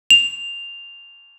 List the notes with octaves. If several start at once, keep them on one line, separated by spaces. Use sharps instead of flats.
F7